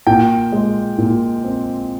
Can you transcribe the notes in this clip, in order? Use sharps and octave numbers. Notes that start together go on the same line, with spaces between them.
A#2 G5
G#3
A#2
C4